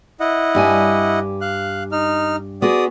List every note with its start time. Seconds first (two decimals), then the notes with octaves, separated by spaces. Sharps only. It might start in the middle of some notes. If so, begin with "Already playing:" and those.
0.20 E4 D#5 F#5
0.55 G2 G4 G#5
1.41 F5 F#6
1.92 D#4 F6
2.62 B3 F#4 G#4 D5 D#6